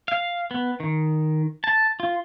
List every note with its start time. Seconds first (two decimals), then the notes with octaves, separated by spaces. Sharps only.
0.08 F5
0.51 B3
0.80 D#3
1.64 A5
2.00 F4